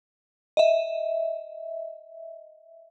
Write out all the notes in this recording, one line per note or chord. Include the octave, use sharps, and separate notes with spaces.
D#5 E5